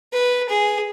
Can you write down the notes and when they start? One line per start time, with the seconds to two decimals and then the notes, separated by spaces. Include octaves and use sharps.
0.13 B4
0.49 G#4